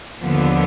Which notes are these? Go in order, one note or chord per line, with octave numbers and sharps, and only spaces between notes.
D#2 D3 F3 B3